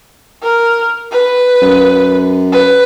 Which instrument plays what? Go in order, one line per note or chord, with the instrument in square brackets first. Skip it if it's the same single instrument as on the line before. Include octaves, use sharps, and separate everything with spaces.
[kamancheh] A#4
B4
[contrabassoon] F#2
[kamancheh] B4